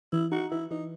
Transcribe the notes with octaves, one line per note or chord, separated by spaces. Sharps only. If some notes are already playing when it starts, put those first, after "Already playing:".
E3 E4
D#4 F#4
E3 E4
E3 D#4